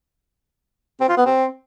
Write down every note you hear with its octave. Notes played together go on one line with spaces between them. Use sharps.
C4
F4
B3
C4